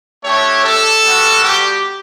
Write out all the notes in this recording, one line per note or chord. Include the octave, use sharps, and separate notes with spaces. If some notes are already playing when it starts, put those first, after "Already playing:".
A3 D4 G4 A4 C#5
A4
G3 B3 F#4
G4